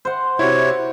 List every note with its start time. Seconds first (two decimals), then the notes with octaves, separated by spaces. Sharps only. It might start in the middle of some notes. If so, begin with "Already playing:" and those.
0.05 C5 F#5
0.39 C3 E4 F#4 C#5